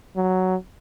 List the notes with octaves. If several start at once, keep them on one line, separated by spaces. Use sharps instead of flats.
F#3